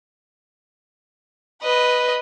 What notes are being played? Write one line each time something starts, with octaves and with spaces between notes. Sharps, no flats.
B4 D#5